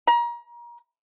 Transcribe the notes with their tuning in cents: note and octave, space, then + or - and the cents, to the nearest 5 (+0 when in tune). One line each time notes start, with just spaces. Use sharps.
A#5 +30